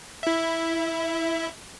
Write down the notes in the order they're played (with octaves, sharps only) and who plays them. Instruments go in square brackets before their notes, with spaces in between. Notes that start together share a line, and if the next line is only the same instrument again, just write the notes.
[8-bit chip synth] E4 E5